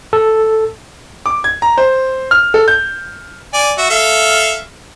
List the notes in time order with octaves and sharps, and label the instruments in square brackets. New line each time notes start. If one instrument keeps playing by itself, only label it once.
[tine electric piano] A4
[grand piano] D6
G#6
A#5
C5
F6
A4
G6
[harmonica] D5 G#5
F#4 E5
A4 E5 F5